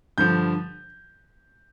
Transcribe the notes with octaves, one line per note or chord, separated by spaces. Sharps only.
G2 D3 F3 G6